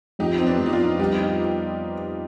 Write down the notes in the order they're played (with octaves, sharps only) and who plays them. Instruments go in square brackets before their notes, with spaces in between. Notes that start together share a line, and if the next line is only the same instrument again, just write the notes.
[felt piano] F2 [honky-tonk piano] D#4 G4
[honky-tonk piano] C4
B3 D4
[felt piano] F2
[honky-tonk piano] D#4
D4 F4
[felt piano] G3 [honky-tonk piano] D#4 G4
[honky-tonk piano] D#4 G4